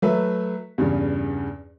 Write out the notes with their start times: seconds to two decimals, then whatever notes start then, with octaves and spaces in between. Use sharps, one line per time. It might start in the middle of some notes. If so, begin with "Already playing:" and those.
0.02 F#3 A3 B4 E5
0.78 E2 G2 C#3